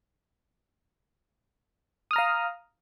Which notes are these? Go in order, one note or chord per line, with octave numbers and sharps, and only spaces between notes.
F5 A#5 D#6 F6